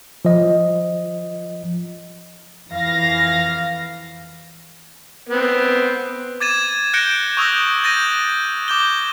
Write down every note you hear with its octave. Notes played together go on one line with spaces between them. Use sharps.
F3 D#5
F2 E3 F5 A#6
B3 C4
D6 G#6 A6 D#7 E7
F#6 G6 A#6 C#7 D7 G7
C#6 D#6 E6 G6 A#6
G6 A6 A#6 D#7
D6 G6 G7